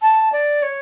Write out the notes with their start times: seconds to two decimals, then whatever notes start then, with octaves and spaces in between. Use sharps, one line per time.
0.01 A5
0.32 D5
0.62 C#5